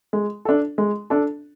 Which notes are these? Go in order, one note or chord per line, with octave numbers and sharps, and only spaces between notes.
G#3
D4 A4
G#3
D4 A4